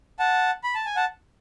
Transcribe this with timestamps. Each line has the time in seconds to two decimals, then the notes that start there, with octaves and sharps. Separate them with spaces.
0.19 F#5 A5
0.64 B5
0.75 A5
0.86 G#5
0.96 F#5 A5